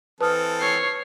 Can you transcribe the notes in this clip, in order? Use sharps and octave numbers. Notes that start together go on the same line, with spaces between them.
E3 C4 A4 B4 A5 D#6 F6
C#5 C7